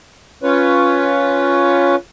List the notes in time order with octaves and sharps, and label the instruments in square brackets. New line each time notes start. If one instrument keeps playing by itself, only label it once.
[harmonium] C#4 F4 B4 C#5